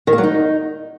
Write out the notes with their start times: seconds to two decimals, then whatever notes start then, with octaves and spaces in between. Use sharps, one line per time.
0.07 D#3
0.13 A#3
0.18 F#3
0.23 D#4